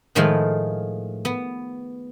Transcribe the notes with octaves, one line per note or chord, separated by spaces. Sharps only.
A2 D#3 F3 G#3 A3 F4
B3